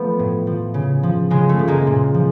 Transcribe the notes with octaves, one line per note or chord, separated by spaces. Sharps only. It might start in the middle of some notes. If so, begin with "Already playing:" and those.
Already playing: F3 A3 B3
A2
F3
C#3
F3
C#3 G#3
A3
F3
G#3 A#3
A#2
F3